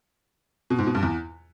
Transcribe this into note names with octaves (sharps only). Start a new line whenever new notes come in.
B2
G#2
B2
G2
E2